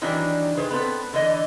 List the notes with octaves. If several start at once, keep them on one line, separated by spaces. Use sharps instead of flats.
D#3 E3 F#3 G3 D4
D#3 G#4 B4 C5
B3 C4 A4 B4
D3 E3 D#5